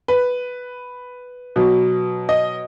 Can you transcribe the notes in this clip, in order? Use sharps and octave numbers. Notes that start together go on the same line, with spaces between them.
B4
B2 F#3
D#5